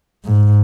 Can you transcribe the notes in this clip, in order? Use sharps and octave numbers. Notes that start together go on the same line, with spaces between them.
G#2